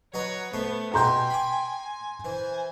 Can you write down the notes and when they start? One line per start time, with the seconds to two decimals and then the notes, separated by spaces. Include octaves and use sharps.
0.14 F#3 B4 C#5 D#5 A#5
0.53 A3 B3 C5
0.94 B2 G4 G5 G#5 A#5 C6 G6
1.30 B5 D6
2.25 E3 C5 G#5